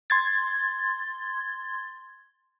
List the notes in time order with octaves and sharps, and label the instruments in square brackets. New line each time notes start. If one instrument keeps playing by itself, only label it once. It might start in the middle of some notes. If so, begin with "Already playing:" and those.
[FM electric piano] C6 G#6 A6